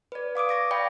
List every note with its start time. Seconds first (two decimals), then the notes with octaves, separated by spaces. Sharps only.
0.12 B4 D5
0.35 F5 D6 D#6 D7
0.49 C#6 A#6 D7
0.71 D5 F5 G5 B5 A#6